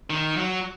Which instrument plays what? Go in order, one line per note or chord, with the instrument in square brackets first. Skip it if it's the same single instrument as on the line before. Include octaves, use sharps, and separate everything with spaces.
[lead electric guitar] D#3
F#3